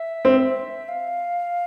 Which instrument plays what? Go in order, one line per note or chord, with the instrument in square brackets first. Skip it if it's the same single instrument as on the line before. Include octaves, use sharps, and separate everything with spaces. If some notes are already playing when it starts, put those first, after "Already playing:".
Already playing: [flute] E5
[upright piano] C4
[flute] F5